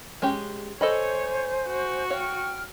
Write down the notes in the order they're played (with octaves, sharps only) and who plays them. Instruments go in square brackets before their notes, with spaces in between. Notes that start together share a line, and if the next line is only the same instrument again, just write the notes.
[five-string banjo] G#3 C#4 G4
[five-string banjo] A4 D#5 B5 [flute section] C5 G#5 G6 [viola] C#5
[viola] F#4 C#6
[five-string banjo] C#5 F5 [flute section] G5 F6